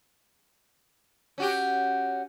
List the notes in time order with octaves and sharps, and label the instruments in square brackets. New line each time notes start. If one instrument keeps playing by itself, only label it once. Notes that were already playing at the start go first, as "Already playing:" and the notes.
[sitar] C#4 F#4 G4